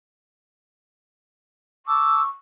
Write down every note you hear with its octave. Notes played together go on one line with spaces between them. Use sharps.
A5 C#6 D6 E6